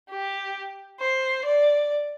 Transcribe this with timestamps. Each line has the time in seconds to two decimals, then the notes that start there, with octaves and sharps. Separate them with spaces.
0.10 G4
1.00 C5
1.45 D5